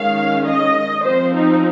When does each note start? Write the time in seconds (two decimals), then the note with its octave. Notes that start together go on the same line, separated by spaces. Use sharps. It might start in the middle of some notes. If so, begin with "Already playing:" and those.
Already playing: D#3 G#3 C#4 F5
0.45 D#5
1.04 F3 C4 C5
1.34 D#4